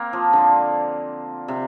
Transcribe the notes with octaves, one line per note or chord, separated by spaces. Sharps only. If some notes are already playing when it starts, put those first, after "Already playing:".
Already playing: A#3 C4
F3
D3
C3